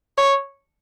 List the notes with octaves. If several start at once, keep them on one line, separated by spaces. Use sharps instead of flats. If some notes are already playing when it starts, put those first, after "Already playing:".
C#5